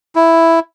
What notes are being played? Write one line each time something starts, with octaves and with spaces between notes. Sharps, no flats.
E4